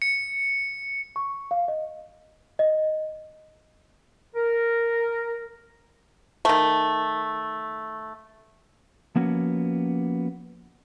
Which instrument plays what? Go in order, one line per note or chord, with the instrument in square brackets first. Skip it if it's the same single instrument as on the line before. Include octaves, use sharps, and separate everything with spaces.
[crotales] C#7
[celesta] C#6
F5
D#5
D#5
[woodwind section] A#4
[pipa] D#3 A3
[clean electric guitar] F3 A#3 B3 C#4 F#4